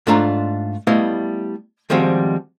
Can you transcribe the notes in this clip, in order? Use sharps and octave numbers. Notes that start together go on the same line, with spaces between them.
G#2 A3 D4 F4 A#5
G3 A3 B3 E4 D#5 F5
D#3 F3 G3 G#3 C4 F#4